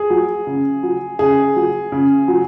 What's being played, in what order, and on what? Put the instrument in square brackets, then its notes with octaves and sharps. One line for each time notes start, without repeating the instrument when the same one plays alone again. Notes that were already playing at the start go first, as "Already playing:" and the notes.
Already playing: [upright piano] G#4
F#3
C#3
F#3
C#3 G#4
F#3
C#3
F#3